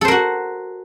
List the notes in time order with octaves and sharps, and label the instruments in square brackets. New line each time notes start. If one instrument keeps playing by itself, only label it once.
[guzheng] A4
C5
A#4
F#4